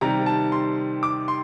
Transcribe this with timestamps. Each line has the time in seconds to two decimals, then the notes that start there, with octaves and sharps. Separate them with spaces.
0.01 C3 D#3 G3 A#5
0.26 A5
0.52 C6
1.03 D6
1.28 C6